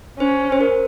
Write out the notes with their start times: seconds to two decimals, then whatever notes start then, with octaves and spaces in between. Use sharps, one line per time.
0.19 C#4 C5
0.52 C5
0.61 A#4